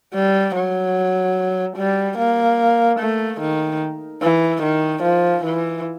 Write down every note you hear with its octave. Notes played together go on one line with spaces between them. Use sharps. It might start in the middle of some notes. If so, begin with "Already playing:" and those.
G3
F#3
G3
A#3
A3
D#3
E3
D#3
F3
E3